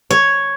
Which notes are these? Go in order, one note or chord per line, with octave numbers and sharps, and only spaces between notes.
C#5